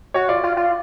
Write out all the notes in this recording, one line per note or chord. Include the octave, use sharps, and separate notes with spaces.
F#4 C#5
F4 D5
F4
F4